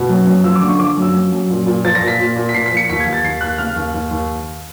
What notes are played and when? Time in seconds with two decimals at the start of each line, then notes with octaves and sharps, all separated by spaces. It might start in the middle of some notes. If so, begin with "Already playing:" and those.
Already playing: B2
0.09 F#2
0.27 F#2
0.44 F3 E6
0.55 D6
0.62 D3
0.68 C#6
0.79 F3 D6
0.97 F#2 E6
1.14 F#2
1.32 F#2
1.50 A#2
1.66 A#2
1.84 F3 A6
1.95 A#6
2.02 A#2
2.08 B6
2.20 A#2
2.36 A#2
2.49 B6
2.54 A#2 C7
2.66 B6
2.71 F3
2.77 C#7
2.89 D#2 B6
3.00 G#6
3.06 D#2
3.13 A6
3.24 D#2 C7
3.41 D#2 F#6
3.58 C#3 F6
3.76 D#2
3.94 D#2
4.11 D#2